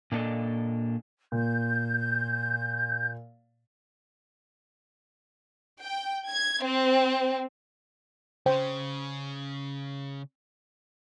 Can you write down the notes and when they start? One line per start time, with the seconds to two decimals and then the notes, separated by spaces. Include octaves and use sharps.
0.12 A#2 A#3 D4 G4 A4 D#5
1.32 A#2 G6
5.82 G5
6.29 G#6
6.64 C4
8.46 C#3 C5 G5